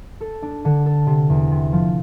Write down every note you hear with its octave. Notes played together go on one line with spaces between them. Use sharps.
A4
D4
D3
A4
C3
E2
C3
F3